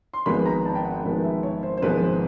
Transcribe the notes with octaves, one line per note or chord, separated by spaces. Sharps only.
C6
G#1 G#2 F3 G#3 B3 B5
A#5
A5
G5
F#5
G#1 G#2 F3 G#3 B3
E5
C#5
C5
C5
G#1 G#2 F3 G#3 B3 B4
C5